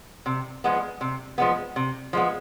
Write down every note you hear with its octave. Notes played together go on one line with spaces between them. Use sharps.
C3
F3 G#3 B3
C3
F3 G#3 B3
C3
F3 G#3 B3